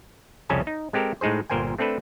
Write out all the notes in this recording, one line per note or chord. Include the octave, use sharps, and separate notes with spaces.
C2 F2 C#3 C#4 G#5 A5
D#4
G#3 C4 G4 A4 A#4
A2 G#3 D#4 G#4 C5
G1 A#2 A#4 C5 G5 G#5
A3 C4 D4 A4 B4